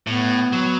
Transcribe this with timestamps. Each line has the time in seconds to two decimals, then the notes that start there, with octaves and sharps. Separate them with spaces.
0.07 A2 B3
0.53 F#3